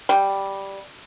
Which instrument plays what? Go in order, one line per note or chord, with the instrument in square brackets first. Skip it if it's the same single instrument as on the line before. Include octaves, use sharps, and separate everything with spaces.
[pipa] G3